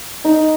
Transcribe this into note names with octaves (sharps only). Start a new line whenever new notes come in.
D#4